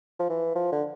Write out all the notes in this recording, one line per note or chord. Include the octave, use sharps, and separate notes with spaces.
F3
E3
F3
D3